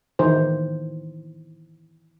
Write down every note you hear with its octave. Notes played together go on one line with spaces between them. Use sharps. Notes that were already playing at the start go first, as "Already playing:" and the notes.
D#3 E3 D#4 C5